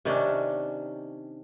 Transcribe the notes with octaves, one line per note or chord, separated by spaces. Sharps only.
C3 D#3 C#4 D4